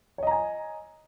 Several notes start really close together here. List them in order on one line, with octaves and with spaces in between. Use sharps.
C#5 D#5 A#5 G#5